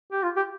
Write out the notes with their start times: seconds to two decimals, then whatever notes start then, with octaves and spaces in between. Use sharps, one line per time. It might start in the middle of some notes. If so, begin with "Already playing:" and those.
0.12 G4
0.23 F4
0.36 G4